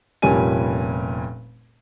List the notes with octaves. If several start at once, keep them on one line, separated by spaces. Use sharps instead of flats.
F1 A#2 G3 C#4 G#5 D#7